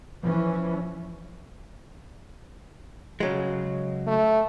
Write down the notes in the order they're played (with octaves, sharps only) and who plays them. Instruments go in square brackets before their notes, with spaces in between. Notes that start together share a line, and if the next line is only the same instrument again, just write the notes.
[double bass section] E3 C#4 [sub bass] F3
[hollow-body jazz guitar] C#3 F#3 G#3
[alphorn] A3